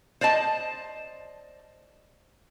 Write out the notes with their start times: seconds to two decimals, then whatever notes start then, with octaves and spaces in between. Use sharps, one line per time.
0.21 C5 D5 D#5 A5